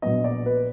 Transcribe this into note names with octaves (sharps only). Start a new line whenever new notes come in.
A#1 A#2 F#3 B3 D#5
D5
B4